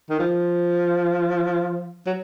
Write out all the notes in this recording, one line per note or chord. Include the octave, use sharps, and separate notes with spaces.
D#3
F3
F#3